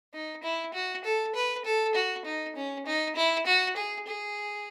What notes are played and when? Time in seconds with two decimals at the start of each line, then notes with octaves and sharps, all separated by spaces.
0.14 D#4
0.43 E4
0.74 F#4
1.05 A4
1.35 B4
1.65 A4
1.95 F#4
2.25 D#4
2.56 C#4
2.86 D#4
3.16 E4
3.46 F#4
3.77 G#4
4.08 G#4